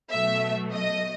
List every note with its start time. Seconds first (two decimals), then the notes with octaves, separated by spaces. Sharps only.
0.11 B2 F#3 A3 E5
0.72 D#5